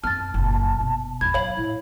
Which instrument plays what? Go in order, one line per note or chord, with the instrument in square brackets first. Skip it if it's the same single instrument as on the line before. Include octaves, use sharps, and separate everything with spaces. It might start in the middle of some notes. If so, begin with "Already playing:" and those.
[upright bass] F#2 C4 [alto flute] A5 [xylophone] F6 A6
[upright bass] F#1 A#2
B2
[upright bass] G#1 E2 [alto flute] B5 [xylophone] G#6
[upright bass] F#3 [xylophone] C#5 F5 F#7
[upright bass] A2 [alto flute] E4